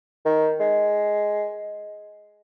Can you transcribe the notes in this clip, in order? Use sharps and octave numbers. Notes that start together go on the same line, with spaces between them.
D#3
G#3